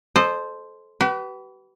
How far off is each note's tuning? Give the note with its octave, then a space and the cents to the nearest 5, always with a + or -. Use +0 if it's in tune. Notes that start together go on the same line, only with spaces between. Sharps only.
A4 -15 C5 +0 D#5 -30
G4 -45 B4 +0